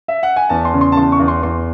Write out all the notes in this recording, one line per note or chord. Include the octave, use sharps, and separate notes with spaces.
E5
F#5
G#5
E2 A5
C6
C#3
C6
A5
E2 C6
C#6
E2
C6
E2 C6